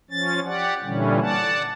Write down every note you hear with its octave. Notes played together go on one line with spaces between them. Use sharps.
F3 C#4 A6
G4 D5 F#5
A#2 D3 E3 G3 C#4
D5 F#5 A5